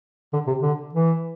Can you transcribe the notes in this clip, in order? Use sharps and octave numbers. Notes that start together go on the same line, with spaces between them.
D3
C3
D3
E3